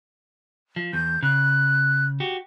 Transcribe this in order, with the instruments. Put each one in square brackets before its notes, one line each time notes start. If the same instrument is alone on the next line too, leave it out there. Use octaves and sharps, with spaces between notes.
[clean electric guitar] F3
[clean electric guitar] E2 [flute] G6
[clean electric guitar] C#3 [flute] F#6
[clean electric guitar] F#4 G4